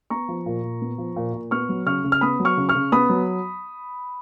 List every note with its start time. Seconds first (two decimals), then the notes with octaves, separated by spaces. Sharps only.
0.10 B3 A#5 C#6
0.29 F3
0.46 A#2
0.63 A#2
0.82 B3
0.98 F3
1.16 A#2
1.34 A#2
1.51 B3 C#6 F6
1.69 F#3
1.86 C#3 C#6 F6
2.04 C#3
2.12 F6
2.21 B3 B5 D#6
2.40 F#3
2.45 C#6 F6
2.57 C#3
2.69 C#6 F6
2.75 C#3
2.92 B3 B5 D#6
3.10 F#3